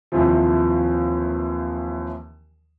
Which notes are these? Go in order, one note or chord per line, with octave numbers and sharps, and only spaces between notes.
D#2 C3 E3 F3